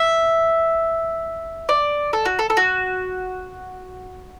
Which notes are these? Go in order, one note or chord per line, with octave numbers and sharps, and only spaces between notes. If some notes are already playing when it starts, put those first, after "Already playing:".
Already playing: E5
D5
A4
F#4
A4
A4
F#4